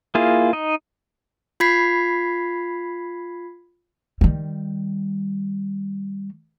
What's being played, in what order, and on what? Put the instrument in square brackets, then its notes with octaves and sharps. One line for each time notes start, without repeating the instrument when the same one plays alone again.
[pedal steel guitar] A#3 E4 F4 G#4
D#4 D#5
[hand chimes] F4 B5 G#6 B6 C7
[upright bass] D#3 G3